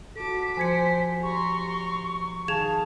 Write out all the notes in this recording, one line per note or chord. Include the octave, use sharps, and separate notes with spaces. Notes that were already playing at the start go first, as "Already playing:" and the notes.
F#4 A4 A5 D6 B6
F3 C5 G#5 G#6 C#7
G4 A#5 C6 C#6
D#3 G#4 F5 A5 G#6 E7 F7